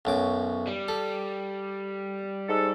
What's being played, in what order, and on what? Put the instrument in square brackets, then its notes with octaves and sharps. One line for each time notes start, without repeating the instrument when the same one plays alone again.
[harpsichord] B1 F#2 D6
[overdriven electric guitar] G3
[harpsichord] A4
[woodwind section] G#2 A4